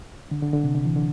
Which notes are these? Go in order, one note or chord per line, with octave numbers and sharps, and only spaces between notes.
D3
D3
D3
C3
D3
E3
D3